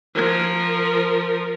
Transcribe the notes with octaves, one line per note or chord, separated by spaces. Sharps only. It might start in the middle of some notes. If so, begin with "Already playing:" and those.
F3 A#4